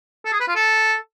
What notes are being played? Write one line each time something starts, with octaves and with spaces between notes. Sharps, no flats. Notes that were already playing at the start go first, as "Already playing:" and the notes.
A4
G#4
B4
F4
A4